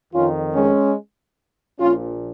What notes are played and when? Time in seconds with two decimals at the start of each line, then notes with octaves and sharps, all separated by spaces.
0.13 F2 D#3 C#4 F4
0.54 G#3 C#4
1.79 A#1 A#2 F3 C#4 F4